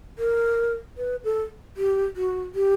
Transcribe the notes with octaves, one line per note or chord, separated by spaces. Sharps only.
A#4
B4
A4
G4
F#4
G4